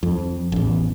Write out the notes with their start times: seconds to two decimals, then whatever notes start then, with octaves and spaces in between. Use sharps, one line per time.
0.03 F2
0.52 A1 E2